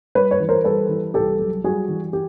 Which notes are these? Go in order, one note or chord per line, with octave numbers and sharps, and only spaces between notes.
G3 B4 C#5
B4 C#5
E3
A#4 C5
G3 A4 B4
E3
C2 G4 A4
F#3
G3 F#4 G#4
E3
G4